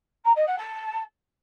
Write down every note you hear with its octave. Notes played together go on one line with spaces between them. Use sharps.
A#5
D#5
F#5
A5